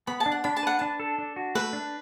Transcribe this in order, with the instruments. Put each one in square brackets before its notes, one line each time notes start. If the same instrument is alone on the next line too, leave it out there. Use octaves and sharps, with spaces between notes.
[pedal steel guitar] B3 [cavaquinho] B5
[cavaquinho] A5
[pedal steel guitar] D4
[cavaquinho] F#5
[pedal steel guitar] D4 [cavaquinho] B5
[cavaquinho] A5
[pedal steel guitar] B4 [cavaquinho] F#5
[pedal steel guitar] D4 [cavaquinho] A5
[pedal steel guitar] A4
D4
F#4
[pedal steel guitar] A3 [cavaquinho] B4
[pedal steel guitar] D4